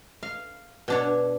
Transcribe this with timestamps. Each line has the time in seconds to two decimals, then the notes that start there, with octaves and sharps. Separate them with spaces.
0.23 F5
0.88 B2 D4 C#5